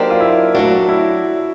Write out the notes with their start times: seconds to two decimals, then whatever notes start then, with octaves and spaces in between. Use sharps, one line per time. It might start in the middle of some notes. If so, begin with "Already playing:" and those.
Already playing: F#3 A#3 D4 D#4 G4 C5
0.10 F4
0.20 E4
0.55 F#3 A3 D4 F#4
0.89 E4